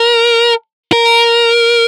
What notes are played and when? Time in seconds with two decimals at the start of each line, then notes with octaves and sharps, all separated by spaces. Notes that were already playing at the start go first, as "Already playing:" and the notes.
Already playing: A#4
0.92 A#4